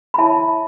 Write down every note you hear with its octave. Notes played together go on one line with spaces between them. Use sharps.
B5
E4 C#5 E5 A5